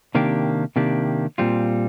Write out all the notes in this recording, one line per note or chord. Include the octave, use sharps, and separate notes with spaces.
C3 D#3 A#3 D4 G4
C3 D#3 A#3 D4 G4
A#2 G3 C4 F4